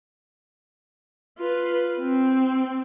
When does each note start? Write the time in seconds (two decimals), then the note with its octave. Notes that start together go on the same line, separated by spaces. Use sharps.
1.38 F4 B4
1.99 C4